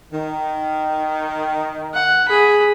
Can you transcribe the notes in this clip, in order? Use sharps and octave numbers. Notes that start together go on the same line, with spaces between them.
D#3
F#5
G#4 B5